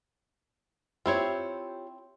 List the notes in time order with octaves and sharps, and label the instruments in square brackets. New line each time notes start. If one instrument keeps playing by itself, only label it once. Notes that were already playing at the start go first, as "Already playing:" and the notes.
[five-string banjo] C4 E4 [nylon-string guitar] F4 G4 C#5